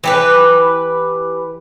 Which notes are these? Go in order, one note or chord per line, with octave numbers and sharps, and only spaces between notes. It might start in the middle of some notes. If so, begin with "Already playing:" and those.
E3 G4 B4